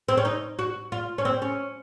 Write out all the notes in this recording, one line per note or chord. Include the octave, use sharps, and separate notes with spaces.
C4
C#4
D#4
F#4
F4
C#4
C4
C#4